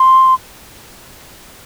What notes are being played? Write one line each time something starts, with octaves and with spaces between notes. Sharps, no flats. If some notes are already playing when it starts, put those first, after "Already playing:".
Already playing: C6